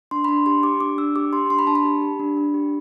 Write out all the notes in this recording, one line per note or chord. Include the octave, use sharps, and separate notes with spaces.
D4 C6
B5
D4 C6
G4 C6
G4 D6
D4 D6
D4 E6
G4 D6
G4 C6
D4 C6
B5
D4 A5
B5
G4
G4
D4
D4
G4